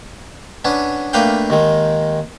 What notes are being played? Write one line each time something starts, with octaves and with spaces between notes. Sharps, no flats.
B3 C#4 D4
A3 A#3 D4 B4 F5 G5
D#2 D#3 G#3